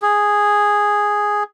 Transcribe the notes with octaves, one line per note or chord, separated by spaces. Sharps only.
G#4